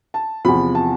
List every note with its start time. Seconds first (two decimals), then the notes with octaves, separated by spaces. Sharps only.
0.14 A5
0.45 E2 C3 F3 B5
0.75 A5